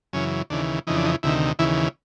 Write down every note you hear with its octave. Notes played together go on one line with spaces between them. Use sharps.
F#2 C#3 E3 C#4
D#2 C#3 E3 D4
F2 C#3 E3 D#4
D4
D#4
D2 C3 D#3 E4
D#2 C#3 E3 E4